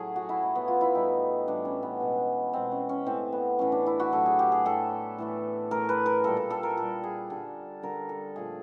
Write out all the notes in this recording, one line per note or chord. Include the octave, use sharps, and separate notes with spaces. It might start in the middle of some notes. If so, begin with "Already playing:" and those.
Already playing: A2 F#3 A3 G#4
F#4
E4
A2 F#3 A3
B3
F4
E4
A2 E3 G3 D#4
A2 E3 G3 D4
C#4
B3
B2 G#3
B2 G#3 C4
C#4
C#4
A2 E3 A3 C4
B3
A2 E3 A3 C#4
D4
E4
F#4
A2 F#3 A3 A4
G#4
G4
G#4
A2 F#3 A3 A4
A2 E3 A3
A2 E3 A3 A#4
B4
A#4
A#2 G3 A4
A4
A4
A#4
A#2 G3 A4
G#4
D3 G3 A4
D3 G3 A#4
A4
A#2 F3 A3 G#4